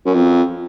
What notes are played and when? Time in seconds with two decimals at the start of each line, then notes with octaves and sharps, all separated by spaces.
0.06 F#2
0.14 F2